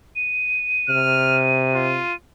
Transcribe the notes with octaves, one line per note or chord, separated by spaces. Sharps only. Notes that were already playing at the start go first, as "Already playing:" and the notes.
D#7
C3 F6
F4